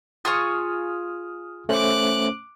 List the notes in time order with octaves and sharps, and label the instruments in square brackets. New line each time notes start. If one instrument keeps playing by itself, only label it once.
[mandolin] F4 G#4 C#6 [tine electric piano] D#6 F6
[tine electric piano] A3 C#4 C5 [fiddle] D6 F#6